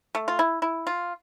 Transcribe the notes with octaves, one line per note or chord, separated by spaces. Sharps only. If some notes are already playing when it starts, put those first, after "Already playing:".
A3
F4
E4
E4
F4